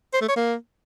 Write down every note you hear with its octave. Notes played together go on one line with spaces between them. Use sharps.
C5
A3
C#5
A#3